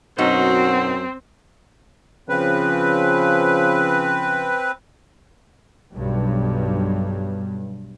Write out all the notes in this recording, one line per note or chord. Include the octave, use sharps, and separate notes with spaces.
F#2 B2 C4 D#4 F#4
C#3 F3 C4 B4
B1 G2